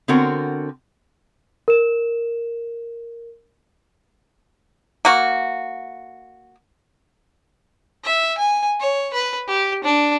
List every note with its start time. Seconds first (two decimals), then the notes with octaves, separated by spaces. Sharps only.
0.08 D3 B3 C4 F#4 A#4 C#5
1.68 A#4 E7
5.05 A#3 F#4
8.04 E5
8.38 G#5
8.80 C#5
9.14 B4
9.48 G4
9.84 D4